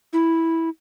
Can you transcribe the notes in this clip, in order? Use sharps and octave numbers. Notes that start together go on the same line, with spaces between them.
E4